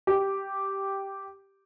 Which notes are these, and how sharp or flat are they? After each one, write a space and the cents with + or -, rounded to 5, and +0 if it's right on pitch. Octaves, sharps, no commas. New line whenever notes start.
G4 -5